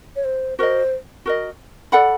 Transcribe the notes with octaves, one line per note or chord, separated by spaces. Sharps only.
C#5
C5
F#4 A#4 C5 D#5
F#4 A#4 D#5
A4 D5 F#5 B5